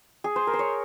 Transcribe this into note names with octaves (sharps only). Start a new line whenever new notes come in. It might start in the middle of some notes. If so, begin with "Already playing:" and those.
G#4
C5
A#4
C5
C#5